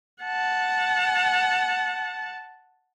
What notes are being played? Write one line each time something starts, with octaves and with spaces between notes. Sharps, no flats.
F#5 A5